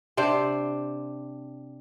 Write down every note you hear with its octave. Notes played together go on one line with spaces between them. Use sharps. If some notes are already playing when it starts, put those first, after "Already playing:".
C3 D4 C5